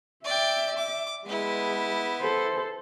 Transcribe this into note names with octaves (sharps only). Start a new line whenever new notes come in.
D5 E5 G5
D6
G#3 B3 E4
A4 C5